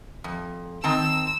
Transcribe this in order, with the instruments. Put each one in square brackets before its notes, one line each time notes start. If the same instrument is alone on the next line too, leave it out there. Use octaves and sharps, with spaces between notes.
[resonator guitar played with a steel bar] F2
[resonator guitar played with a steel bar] D#3 C4 A5 [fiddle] E6